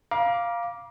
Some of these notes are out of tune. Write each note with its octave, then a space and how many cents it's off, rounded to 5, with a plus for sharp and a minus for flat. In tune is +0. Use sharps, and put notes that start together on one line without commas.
F5 +0 A#5 +35 D6 +0